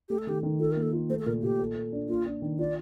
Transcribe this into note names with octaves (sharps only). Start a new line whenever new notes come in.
A3 G4
A4
D#3 G4
D#3
F4 A4
A#3 A#4
A4
F4
A3 C5
A4
A#2 A#4
A#2 G4
A4
A4
D4
A#3 F4
D4
D#3
F4 D5